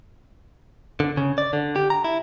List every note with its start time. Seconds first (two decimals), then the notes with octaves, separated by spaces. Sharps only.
1.00 D3
1.17 C#3
1.38 D5
1.53 D3
1.76 G4
1.90 A#5
2.04 E4